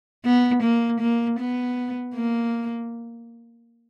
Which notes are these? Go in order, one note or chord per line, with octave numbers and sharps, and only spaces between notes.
B3
A#3
A#3
B3
A#3